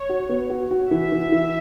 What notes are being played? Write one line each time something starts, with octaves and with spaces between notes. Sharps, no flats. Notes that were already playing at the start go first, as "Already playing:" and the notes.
Already playing: C#5
F#4
B3
F#4
F#4
E3 E5
E3
E3